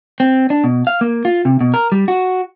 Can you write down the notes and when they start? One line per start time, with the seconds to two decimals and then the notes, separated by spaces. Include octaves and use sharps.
0.20 C4
0.50 D4
0.64 B2
0.87 F5
1.01 A#3
1.25 F4
1.45 C3
1.61 B2
1.74 A#4
1.92 G3
2.08 F#4